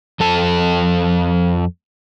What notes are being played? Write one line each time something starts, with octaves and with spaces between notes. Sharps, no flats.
F2 A4 A5